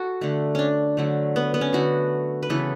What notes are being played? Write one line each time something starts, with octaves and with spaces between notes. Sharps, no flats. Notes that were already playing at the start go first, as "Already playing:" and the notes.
Already playing: F#4 A4
D3 A3
C#4 D4
D3 F#3 A3
B3
B3
C#4
D3 A3 F#4
B4
C#3 E3 B3 A4